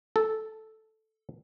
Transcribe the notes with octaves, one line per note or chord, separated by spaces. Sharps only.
A4